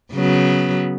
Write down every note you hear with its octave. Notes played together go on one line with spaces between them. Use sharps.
C#3 F#3 B3